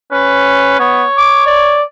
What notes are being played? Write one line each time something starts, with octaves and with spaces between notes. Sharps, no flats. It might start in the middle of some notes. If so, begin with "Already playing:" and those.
C#4 B4
B3 C#5
D6
D5